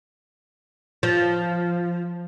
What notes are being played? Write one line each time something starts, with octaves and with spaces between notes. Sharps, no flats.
F3